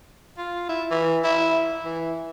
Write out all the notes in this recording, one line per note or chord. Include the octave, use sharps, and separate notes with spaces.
F4
E4
E3
E4
E3